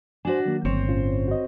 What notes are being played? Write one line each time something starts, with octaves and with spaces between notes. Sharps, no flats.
D4 F#4 C5 G#5
D#3 F#3 A#3
G1 C4 C5 C#5
A2 C#4 F4
F#4 D#5